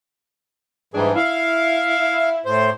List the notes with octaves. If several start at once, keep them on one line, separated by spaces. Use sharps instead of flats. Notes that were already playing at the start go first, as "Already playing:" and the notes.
G#2 E3 G3 D4 G#4
E4 F5
A2 C5